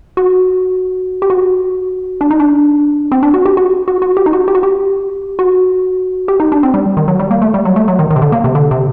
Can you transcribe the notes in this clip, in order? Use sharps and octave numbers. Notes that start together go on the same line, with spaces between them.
F#4
G4
F#4
D4
D#4
D4
C4
D4
F#4
G4
F#4
F#4
F#4
G4
D#4
F#4
G4
F#4
G4
F#4
G4
D#4
D4
C4
G3
D#3
F#3
G3
A#3
A3
G3
F#3
A3
F#3
D#3
D#3
C3
D3
A#3
C3
D3
C3